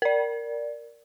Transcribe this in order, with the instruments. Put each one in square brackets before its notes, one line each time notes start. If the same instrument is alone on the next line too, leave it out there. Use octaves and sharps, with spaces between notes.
[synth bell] A#4 D5